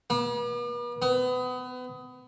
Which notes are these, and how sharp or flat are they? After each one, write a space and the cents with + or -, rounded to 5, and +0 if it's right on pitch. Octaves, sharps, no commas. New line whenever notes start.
B3 -45
B3 +30